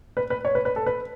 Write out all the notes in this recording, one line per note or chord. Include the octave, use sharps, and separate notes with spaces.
B4
B4
C#5
B4
B4
A4
B4